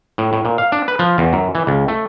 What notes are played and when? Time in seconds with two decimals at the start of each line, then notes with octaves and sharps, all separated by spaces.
0.18 A2
0.33 A2
0.45 A#2
0.58 F5
0.72 D4
0.88 B4
0.99 F3
1.18 E2
1.33 F#2
1.55 E3
1.67 C#2
1.88 A3